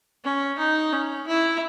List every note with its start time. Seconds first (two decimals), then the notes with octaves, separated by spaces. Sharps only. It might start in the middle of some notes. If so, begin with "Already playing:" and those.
0.24 C#4
0.58 D#4
0.92 C#4
1.27 E4